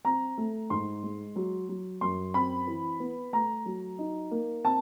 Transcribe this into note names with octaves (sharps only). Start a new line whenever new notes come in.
C4 A#5
A3
G#2 C6
G#3
F#3
F#3
F#2 C6
C4 B5
E3
B3
A3 A#5
F#3
D#4
A#3
C4 A5